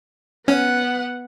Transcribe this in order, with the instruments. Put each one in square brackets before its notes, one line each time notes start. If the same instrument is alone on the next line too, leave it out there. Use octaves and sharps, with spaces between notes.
[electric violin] B3 F#5 [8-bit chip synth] C#4